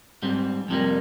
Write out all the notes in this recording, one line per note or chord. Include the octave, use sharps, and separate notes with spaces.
G#2 G3 C4
F2 C3 D#3 G3 A#3